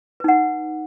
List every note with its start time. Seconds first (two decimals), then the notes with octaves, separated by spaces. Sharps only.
0.20 B4
0.24 D#4
0.28 F#5